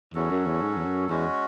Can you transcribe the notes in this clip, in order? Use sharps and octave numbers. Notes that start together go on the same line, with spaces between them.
E2 F#3 C#4 F#4 A4
F#2
E2
G#2
E2
F#2
E2 G#3 C#4 F#4